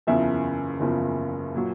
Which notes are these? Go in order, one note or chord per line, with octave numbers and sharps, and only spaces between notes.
F#1 E2 C#3 F3 E5
F#1 E2 C#3 F3
A#2 F#3